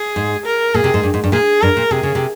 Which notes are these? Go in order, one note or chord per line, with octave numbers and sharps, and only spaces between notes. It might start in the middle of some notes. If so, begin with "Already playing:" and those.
Already playing: G#4
G#2
A#4
A#2 G#4
C3
G#2
G2
G#2
G2
A#2 G#4
G2 A#4
A#2
C3 G#4
C#3
C3